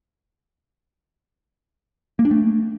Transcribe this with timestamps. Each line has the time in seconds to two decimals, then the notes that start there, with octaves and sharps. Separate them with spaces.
2.19 A#3
2.25 D4
2.31 A3